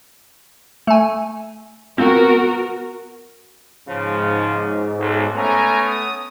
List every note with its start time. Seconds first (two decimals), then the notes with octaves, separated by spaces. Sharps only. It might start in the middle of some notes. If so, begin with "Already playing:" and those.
0.87 A3 G#5
1.98 B3 C4 F#4 A#4
3.88 G#2 C#3 F3
4.98 B1
5.35 A3 B3 C#4 G#5 A#5
5.86 D#6